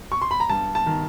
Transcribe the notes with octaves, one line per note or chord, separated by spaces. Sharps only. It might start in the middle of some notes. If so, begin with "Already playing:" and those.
C#6
C6
B5
A#5
G2 A5
A5
D#3